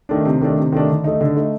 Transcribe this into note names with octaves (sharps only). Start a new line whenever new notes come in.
D#3 A3 D4
C3
D#3 A3 D4
C3
D#3 A3 D4
D3
A3 D#4
D3
A3 D#4